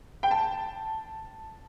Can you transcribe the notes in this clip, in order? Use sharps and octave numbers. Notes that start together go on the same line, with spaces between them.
G5
A5